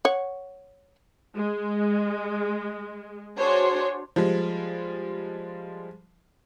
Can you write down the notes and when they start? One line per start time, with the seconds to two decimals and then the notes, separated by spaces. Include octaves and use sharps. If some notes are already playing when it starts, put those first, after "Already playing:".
0.05 C#5 F#5
1.37 G#3
3.38 D4 F#4 G#4 C5 C#5
4.16 F3 G3 G#3